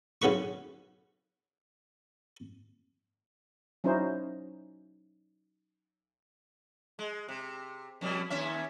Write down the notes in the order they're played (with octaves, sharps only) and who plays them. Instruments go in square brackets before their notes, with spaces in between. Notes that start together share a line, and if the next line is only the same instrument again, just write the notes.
[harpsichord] B1 C#3 B3 B4 C#6
[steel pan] F#3 C#4 D#4 E4 C5
[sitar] G#3
C3
F2 B2 G3
D#2 C#4 E5